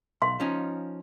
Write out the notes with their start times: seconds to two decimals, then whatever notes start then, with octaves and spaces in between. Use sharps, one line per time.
0.22 B1 F5 C6
0.40 F3 C#4 D#4